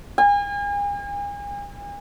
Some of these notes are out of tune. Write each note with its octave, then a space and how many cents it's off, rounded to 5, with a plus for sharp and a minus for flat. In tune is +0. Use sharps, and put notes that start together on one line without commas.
G#5 -40